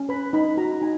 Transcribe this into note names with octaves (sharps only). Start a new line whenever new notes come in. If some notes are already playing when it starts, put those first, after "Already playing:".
Already playing: C#4
B4 B5
D#4 B5
F#4 A#5
D#4 G#5